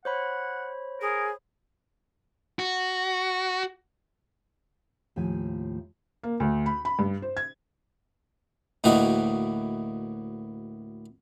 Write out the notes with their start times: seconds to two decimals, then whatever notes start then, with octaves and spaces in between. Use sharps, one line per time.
0.05 C5 C#5 F#5 B5
1.01 G#4 A#4
2.59 F#4
5.16 D#2 A2 F3 G#5
6.23 A#3
6.40 D2
6.66 B5
6.85 B5
6.99 G2
7.22 C5
7.37 G#6
8.84 D2 A2 E3 A#3 F#4 D#5